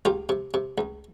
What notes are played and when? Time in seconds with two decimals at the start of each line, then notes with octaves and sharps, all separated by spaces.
0.05 C#2 F4 G4
0.29 C3
0.54 C3
0.78 C#2